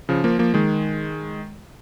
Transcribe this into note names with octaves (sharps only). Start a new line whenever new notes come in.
C#3 F3
F3 A#3
F3 A#3
D#3 G#3